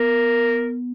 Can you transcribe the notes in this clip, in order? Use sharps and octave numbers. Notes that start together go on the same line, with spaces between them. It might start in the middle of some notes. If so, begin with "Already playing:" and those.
Already playing: B3 A#4